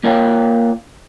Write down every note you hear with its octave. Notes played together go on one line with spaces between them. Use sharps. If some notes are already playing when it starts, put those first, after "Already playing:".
A#3 F4 A#4 C#5 F5 G5